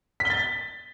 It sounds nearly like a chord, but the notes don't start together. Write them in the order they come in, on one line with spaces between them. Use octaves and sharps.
B6 G7 A6